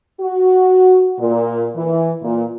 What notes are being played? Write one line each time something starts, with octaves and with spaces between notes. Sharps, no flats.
F#4
A#2
E3
A#2